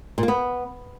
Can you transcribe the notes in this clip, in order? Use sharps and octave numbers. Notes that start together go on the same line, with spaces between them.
A#2
A#3
B3